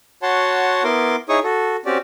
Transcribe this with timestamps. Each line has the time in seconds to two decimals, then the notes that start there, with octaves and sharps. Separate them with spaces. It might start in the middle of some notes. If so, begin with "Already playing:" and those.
0.22 F#4 C#5 F#5 A5 C6
0.84 B3 E4 A#4 C6 D6
1.29 D#4 E4 G#4 C#5 C#6 D#6
1.43 F#4 A4
1.86 C4 C#4 F#4 G4 D5